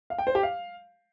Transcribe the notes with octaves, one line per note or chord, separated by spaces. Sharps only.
F5
G5
C5
G4
F5